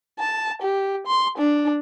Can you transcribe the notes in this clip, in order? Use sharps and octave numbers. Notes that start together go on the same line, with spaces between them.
A5
G4
C6
D4